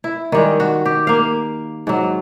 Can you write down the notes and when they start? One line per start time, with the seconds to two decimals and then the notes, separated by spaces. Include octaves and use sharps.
0.04 E4
0.32 D#3 G3 G#3
0.60 F#4
0.85 G4
1.07 A#3 F5
1.87 G#2 F#3